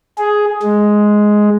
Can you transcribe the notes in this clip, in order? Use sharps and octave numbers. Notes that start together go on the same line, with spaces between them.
G#4
G#3